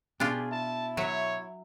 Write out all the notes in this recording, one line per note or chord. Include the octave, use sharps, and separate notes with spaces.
B2 D4 F4 G4 G#4
E4 A5
F#3 C#5 E5